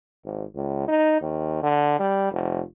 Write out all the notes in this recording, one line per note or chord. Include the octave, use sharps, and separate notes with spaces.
G#1
C#2
D#4
D#2
D3
G3
F1